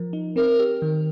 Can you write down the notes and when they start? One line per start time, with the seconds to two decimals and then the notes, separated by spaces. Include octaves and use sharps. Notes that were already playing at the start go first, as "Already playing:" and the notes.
Already playing: F3 A#4
0.13 D#4
0.36 C4 A#4
0.59 G4
0.82 D#3